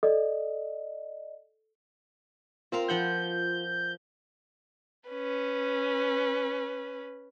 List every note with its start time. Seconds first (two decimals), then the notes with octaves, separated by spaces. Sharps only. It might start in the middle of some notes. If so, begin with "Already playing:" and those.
0.03 A4 D5 D#5
2.72 C4 F4 A#4 F5
2.88 F3 F#5 B5 G6
5.09 C#4 B4